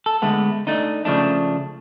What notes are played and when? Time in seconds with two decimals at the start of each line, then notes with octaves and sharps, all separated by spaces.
0.06 A4
0.22 D3 G#3 A3 B3
0.67 A3 D4 D#4
1.05 C#3 F3 A3 D4